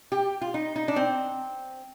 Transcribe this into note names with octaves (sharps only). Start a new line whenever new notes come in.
G4
F4
D#4
D#4
D4
C4